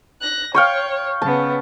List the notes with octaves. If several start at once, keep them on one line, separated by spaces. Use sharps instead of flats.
F#6 A#6
C#5 F5 G5 C#6
C#3 B3 A5